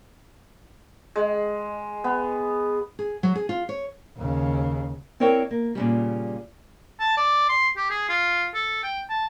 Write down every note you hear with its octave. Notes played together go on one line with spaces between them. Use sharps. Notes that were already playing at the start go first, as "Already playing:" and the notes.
G#3
B3
G#4
F#3
G#4
F4
C#5
D#2 C#3
C4 E4 A#4 C#5 D5 G5
A#3
A#2 C#3 G3
A5
D5
C6
G4
G#4
F4
A4
G5
A5